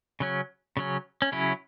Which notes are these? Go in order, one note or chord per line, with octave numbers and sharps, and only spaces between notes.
C#3 F#3 C#4
C#3 F#3 C#4
C#4
C#3 F#3 C#4 E4